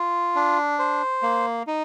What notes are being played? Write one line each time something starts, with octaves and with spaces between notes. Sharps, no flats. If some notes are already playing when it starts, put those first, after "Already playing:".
Already playing: F4
D4
C5
A#3
D#4